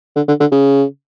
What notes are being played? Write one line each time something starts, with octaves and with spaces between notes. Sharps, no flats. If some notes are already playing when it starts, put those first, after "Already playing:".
D3
D3
D3
C#3